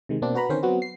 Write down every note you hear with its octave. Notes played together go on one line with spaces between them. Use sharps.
C3 D#3 G#3
B2 A#3 C4 D4
F#4 B4 A#5 B5
D3 D#3 C4 C#4 A#4 C5
F#3 B3 C4 F#4
C7